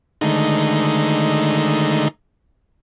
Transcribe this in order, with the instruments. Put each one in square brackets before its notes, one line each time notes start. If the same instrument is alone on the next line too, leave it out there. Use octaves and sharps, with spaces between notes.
[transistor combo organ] D3 D#3 G#3 A3 D#4